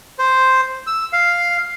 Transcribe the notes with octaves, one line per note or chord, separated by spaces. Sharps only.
C5
E6
F5